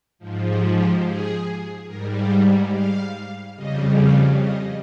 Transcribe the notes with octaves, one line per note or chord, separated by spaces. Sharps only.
G#2 F3
G4
G4
G#4
G#2 G3 A#4
F5
F5
F2 C#3 G3 D#5
F5
D#5